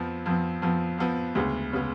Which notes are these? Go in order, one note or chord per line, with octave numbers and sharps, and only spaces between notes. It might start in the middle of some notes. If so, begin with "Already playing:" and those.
Already playing: F2 F3 B3
F2 F3 B3
F2 F3 B3
F2 F3 B3
D2 C#3 G#3 B3
C#3 G#3 B3